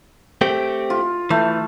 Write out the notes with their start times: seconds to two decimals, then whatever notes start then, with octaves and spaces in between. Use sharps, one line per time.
0.41 A3 C4 G4
0.90 F4
1.31 E3 A3